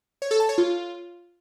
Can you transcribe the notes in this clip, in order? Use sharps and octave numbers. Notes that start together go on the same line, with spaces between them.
C#5
A4
A5
C#5
F4